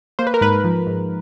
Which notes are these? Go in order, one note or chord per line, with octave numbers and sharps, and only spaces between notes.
A#3 C5
B4
A#4
G#2 B4
F3
G#2